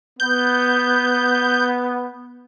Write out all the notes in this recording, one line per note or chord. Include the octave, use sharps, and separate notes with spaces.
B3 G6